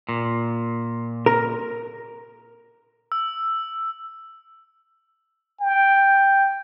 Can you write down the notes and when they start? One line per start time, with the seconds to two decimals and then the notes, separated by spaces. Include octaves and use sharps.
0.09 A#2
1.26 A#4
3.12 E6
5.61 G5